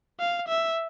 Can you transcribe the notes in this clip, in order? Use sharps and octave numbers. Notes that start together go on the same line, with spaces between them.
F5
E5